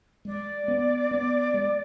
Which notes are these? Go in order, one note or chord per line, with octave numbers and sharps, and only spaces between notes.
G#3 D5
B3
B3
G#3